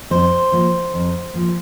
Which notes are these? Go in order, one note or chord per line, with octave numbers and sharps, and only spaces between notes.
F2 C5
F3 A#3
F2
F3 A#3